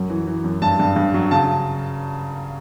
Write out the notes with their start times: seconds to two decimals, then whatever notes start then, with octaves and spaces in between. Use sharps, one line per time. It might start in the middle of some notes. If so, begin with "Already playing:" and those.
Already playing: F#2 F#3
0.10 E3
0.27 E3
0.44 F#2
0.62 G2 A5
0.80 G2
0.96 G2
1.14 F#3
1.31 C#3 A5